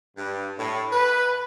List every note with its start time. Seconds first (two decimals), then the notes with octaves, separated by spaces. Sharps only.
0.17 G2
0.58 A2
0.92 B4